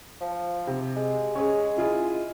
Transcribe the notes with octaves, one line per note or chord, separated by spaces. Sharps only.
F3
C3
G#3
C#4 G#4
E4 F4 G#4